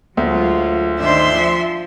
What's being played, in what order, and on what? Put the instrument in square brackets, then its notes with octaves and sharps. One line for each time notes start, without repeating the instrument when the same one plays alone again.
[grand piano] D2 [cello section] F#3 G#3 F4
[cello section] D#3 D4 C5 [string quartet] E5 C6
[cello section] F3